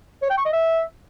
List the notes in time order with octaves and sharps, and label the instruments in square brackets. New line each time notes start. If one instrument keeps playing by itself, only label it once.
[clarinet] C#5
G5
C#6
D#5
E5